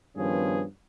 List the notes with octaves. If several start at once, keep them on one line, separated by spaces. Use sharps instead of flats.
G2 D#3 F3 B3 C#4 G#4